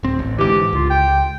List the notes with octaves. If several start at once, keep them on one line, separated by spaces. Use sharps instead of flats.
D1 C4
A1
G#2 D3 E3 G4
C#2 F4
G5